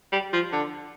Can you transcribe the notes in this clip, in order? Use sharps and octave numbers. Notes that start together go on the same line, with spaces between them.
G3
F3
D3